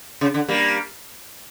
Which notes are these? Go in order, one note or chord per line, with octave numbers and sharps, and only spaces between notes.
C#3
D3
G3 A#3